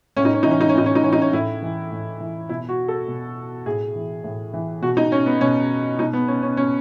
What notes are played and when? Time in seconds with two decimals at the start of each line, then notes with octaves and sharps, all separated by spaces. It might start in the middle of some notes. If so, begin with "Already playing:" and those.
0.17 A2 C#4
0.25 D#4
0.34 C#4
0.43 E3 D#4
0.51 C#4
0.61 D#4
0.69 C#4
0.75 A2 D#4
0.86 C#4
0.95 D#4
1.04 E3 C#4
1.13 D#4
1.22 C#4
1.33 A2 E4
1.62 E3
1.92 A2
2.20 E3
2.49 B2 E4
2.69 F#4
2.88 A4
3.08 B2
3.66 A2 G#4
3.95 E3
4.24 A2
4.53 E3
4.82 B2 F#4
4.97 D#4
5.12 C#4
5.26 B3
5.41 B2 C#4
5.99 B2 D#4
6.13 B3
6.28 C#4
6.43 C#4
6.57 B2 C#4